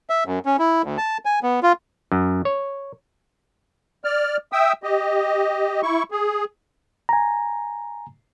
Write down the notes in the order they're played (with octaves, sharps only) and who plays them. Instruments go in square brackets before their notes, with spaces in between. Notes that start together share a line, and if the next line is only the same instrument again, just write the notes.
[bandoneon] E5
F#2
C#4
E4
D2
A5
G#5
B3
F4
[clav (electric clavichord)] F#2
C#5
[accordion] D5 F6
E5 G5 D#6 E6
G4 D#5
E4 C#6
G#4
[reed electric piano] G#5 A#5